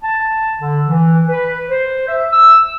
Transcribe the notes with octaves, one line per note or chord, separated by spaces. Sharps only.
A5
D3
E3
B4
C5
E5
E6